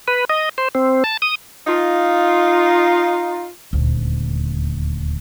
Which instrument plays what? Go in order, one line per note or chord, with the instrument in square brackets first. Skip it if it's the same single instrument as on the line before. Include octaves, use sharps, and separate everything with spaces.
[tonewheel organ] B4
D#5
C5
C4
A5
D#6
[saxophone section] D#4 F4
[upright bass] D#1 D2